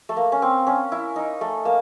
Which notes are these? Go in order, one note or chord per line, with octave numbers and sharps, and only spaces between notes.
A3
A#3
C#4
C4
C#4
E4
D#4
A3
A#3